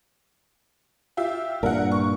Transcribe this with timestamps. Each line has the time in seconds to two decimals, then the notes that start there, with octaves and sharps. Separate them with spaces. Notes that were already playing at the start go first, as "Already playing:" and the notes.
1.17 F4 G4 E5
1.63 G2 A#2 A#4 F#5
1.92 C#6